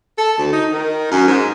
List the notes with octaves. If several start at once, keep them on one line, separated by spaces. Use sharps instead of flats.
A4
D2
D#4
D#3
F#2
G#2